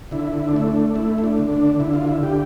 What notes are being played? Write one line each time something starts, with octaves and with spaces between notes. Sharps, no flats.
D3 E4
E4
D4
A3 E4
D4
A3 E4
E4
D4
D3
D4
D3 E4
F4
E4
D3 G4